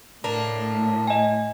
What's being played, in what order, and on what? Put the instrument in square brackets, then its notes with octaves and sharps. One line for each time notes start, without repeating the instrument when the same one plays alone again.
[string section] A2 [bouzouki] A#3 D4
[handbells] D#5 G#5